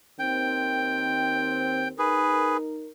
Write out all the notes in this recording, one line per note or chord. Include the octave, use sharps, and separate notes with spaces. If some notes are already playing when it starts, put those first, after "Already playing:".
D#2 D#3 C4 G5
D#4 G#4 A#4 B4